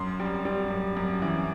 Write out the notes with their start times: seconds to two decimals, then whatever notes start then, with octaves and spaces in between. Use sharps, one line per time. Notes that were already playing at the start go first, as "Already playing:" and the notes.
Already playing: F#2 C6
0.20 G3
0.45 G3
0.71 F#2
0.97 F#2
1.22 E3